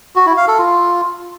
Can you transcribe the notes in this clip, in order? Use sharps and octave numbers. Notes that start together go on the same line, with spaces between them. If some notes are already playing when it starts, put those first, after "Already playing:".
F#4
E4
F5
A4
F4